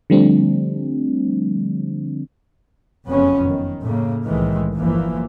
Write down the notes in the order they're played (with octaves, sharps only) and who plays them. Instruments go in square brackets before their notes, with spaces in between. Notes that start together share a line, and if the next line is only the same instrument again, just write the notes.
[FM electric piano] D3 F3 G3 A3 C4 D4
[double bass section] F#1 F2 C#3 B3 C#4
D#3
A2 C#3 A#3
C2 A2 D#3 E3 G#3
G1 E3 F3 A#3